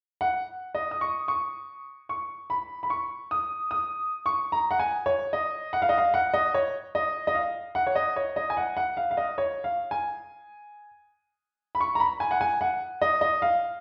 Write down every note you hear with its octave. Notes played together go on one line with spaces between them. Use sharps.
F#5
D#5
D#6
C#6
C#6
C#6
B5
B5
C#6
D#6
D#6
C#6
A#5
F#5
G#5
C#5
D#5
F#5
F5
D#5
F5
F#5
D#5
C#5
D#5
D#5
F5
F#5
C#5
D#5
C#5
D#5
G#5
F#5
F#5
F5
F5
D#5
C#5
F5
G#5
B5
C#6
A#5
B5
G#5
F#5
G#5
F#5
D#5
D#5
F5